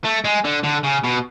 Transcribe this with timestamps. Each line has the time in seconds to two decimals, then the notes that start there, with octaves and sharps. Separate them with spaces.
0.04 A3
0.24 G#3
0.45 D3
0.64 D3
0.84 C#3
1.04 B2